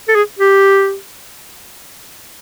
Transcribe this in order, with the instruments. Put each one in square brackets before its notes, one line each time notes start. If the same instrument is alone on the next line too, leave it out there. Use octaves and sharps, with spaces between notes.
[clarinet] A4
G#4
G4